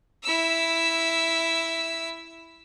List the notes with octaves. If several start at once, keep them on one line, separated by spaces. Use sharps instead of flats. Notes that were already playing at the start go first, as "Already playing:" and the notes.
E4 E6